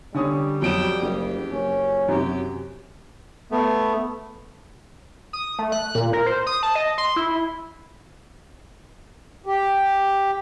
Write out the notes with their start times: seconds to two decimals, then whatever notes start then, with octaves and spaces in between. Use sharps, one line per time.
0.14 D3 G3 C#4 D#6
0.62 F2 F#3 G5 D#6 D7 E7
1.02 F#1 G4
1.52 F#1 C#4
2.08 F#2 C3 F#3 G4
3.51 A3 B3
5.33 D#6
5.59 A3
5.72 F#6
5.95 A#2
6.13 A#4
6.26 C5
6.47 D#6
6.63 A5
6.75 D#5
6.98 C6
7.16 E4
9.46 G4